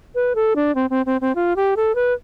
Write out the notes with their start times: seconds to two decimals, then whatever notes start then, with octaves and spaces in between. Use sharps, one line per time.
0.15 B4
0.35 A4
0.56 D4
0.75 C4
0.90 C4
1.06 C4
1.21 C4
1.35 F4
1.56 G4
1.76 A4
1.95 B4